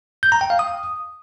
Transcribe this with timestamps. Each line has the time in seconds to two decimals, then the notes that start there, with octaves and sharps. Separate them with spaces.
0.23 G6
0.32 A#5
0.41 G5
0.50 F5
0.59 D#6